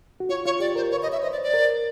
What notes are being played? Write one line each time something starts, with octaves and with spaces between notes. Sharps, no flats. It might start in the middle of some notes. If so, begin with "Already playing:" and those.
F#4
F4 C#5
F4 C#5
G4 D5
A#4 C5
B4 C#5
D#5
C#5
E5
C5 D#5
D5
D5
A#4